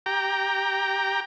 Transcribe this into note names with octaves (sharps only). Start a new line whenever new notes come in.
G4 G5 A#5